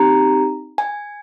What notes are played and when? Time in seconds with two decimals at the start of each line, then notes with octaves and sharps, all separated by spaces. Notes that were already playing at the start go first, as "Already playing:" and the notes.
Already playing: C4 D#4 G4 A#5
0.78 G#5